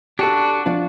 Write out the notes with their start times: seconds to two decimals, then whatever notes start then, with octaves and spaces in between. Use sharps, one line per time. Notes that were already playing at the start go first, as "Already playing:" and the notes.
0.19 D4 F#4 G4 A4
0.66 F3 D4 F4